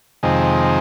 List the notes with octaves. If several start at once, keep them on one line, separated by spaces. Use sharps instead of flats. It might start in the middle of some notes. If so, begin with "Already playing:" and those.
F2 C3 D#3 G#3